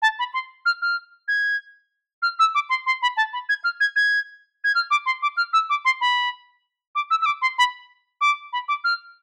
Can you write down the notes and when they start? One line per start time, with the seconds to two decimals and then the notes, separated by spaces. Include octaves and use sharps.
0.02 A5
0.19 B5
0.34 C6
0.66 F6
0.82 F6
1.28 G#6
2.22 F6
2.39 E6
2.55 D6
2.70 C6
2.86 C6
3.02 B5
3.17 A5
3.33 B5
3.49 G#6
3.64 F6
3.80 G#6
3.96 G#6
4.64 G#6
4.75 F6
4.91 D6
5.06 C6
5.22 D6
5.37 F6
5.53 E6
5.70 D6
5.85 C6
6.01 B5
6.95 D6
7.11 E6
7.22 E6
7.26 D6
7.42 C6
7.58 B5
8.21 D6
8.53 B5
8.68 D6
8.84 F6